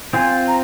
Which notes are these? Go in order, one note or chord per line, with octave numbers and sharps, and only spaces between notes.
C4 F4 C5 G#5
A#5